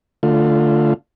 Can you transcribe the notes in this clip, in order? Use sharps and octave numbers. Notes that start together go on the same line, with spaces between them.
D3 A3 F4